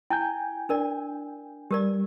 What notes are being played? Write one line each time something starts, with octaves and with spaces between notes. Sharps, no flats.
E4 G5 G#5 G6
D4 A#4 D5
G3 G4 A#4 D5